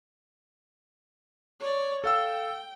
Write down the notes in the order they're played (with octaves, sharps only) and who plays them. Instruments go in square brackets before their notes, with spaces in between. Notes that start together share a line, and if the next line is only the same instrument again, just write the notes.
[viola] C#5 D5
[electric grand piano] A4 F5 E6 [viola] G5